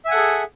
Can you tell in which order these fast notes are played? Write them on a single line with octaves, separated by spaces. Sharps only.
E5 G#5 F#5 A4 G#4